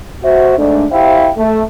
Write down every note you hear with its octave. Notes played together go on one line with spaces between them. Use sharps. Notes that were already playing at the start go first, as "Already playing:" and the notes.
F#4 C5 E5
G#2 A3 D4
E4 G4 C5 E5 F5 G5
A3